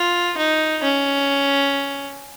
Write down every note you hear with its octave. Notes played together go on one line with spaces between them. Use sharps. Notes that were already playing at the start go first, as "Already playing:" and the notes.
Already playing: F4
D#4
C#4